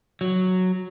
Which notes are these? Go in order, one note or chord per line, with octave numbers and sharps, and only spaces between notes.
F#3